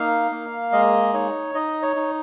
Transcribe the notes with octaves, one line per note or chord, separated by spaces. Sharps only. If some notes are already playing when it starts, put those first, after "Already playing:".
Already playing: A#3 D#4 F5
A#3
G#3 D#5
D#4 C#5
D#4 D#5
C#5
D#4